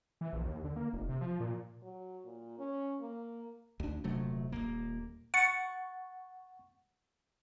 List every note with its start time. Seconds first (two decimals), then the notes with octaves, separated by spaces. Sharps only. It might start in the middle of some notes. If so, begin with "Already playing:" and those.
0.21 E3
0.33 A#1
0.45 D#2
0.64 D3
0.76 A#3
0.93 F1
1.09 C3
1.21 F3
1.40 A#2
1.83 F#3
2.25 A#2
2.59 C#4
3.01 A#3
3.80 D2 D4
4.04 D#1 C3 F#3 A3
4.52 D#1 E2 A#3
5.34 F#5 C#6 A6 C#7